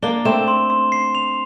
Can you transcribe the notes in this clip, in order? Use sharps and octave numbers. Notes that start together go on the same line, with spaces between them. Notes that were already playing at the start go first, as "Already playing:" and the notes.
A#3 D4 G7
A3 C4 E7
C6
C6
C7
F7